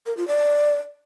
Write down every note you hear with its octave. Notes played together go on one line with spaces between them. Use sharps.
A#4
F4
D5